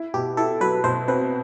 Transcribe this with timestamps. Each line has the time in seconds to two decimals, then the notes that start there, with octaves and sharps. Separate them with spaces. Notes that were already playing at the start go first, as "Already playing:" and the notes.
Already playing: E4
0.14 B2 G4
0.37 E4 A4
0.60 F#3 B4
0.84 B2 C5
1.08 C4 B4